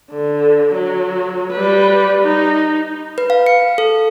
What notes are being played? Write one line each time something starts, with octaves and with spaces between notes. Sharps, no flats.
D3
F#3
G3 B4
D#4
B4
F5
C#7
A4